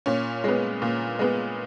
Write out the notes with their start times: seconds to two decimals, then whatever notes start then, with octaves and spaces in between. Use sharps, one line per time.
0.06 A#2 C#4
0.44 G#3 B3
0.82 A#2
1.19 G#3 B3